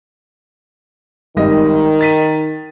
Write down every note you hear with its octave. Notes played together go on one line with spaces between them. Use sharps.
G#1 D#3 G3 D#5
A6 B6 D#7